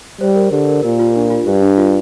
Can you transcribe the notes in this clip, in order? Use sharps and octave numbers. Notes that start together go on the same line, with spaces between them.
G3 C5
A#4
D3 G4
A#4
A#2 A#4
F4
D4
F4
G2 G4
D4
F4